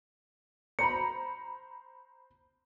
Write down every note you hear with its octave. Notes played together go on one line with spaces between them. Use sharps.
C5 A#5 B5 C#7